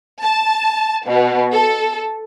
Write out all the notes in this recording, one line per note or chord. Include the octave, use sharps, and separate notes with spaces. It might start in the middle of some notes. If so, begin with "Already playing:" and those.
A5
B2
A4